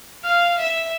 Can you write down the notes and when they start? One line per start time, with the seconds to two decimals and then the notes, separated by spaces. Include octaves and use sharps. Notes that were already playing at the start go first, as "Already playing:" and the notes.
0.24 F5 F6
0.58 E5